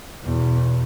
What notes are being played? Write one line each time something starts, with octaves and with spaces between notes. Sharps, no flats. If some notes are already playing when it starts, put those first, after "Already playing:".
E2 B2